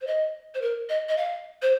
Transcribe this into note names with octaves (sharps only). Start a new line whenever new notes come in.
C5
D#5
C5
A#4
D#5
D#5
F5
C5